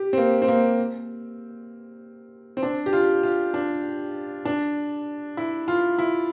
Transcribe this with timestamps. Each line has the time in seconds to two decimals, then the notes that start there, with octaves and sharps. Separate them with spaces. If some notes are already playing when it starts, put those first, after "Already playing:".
Already playing: G4
0.13 C4
0.17 A#3
0.42 C4
0.48 A#3
2.57 C4
2.63 D4
2.86 G4
2.93 F4
3.23 F4
3.54 D4
4.45 D4
5.37 E4
5.68 F4
5.98 E4